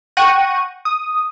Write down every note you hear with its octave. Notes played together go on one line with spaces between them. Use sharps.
F#5 G5 C#6 F#6 A#6 D#7
D#6